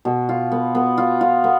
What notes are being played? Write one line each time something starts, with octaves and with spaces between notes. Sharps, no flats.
B2
F4
B3
B3
F4
F4
B3